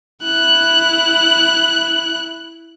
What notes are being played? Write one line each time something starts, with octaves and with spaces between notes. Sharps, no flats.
E4 F#6